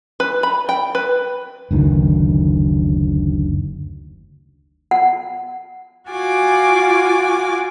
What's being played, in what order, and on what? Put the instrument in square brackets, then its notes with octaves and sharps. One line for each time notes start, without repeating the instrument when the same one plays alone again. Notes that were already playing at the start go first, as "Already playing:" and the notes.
[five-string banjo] B4
B5
G5
B4
[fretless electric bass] F#1 D2 D#3
[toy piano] F#5
[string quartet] F4 F#4 G#5 D6